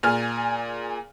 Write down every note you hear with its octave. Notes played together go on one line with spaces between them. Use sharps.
A#2 G#4 F6